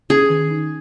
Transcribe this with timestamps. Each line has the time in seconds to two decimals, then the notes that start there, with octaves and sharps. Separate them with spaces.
0.10 C#4 G#4
0.30 D#3
0.50 D#4